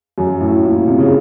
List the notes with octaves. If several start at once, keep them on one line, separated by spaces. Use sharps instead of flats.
F#2
A2
A#2
C3
C#3